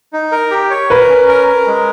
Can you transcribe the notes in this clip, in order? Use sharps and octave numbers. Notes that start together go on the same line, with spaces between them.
D#4
A#4
G4
C#5
A#4 B4
C#4
A#4
A#4
G#3